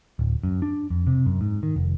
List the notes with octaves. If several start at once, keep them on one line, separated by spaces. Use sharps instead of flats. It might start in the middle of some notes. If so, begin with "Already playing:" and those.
D1
F#2
D4
F2
C3
F#2
G#2
D#3
F1